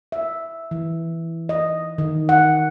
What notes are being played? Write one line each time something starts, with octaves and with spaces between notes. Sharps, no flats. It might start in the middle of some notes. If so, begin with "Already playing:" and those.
E5
E3
D#5
D#3
F#5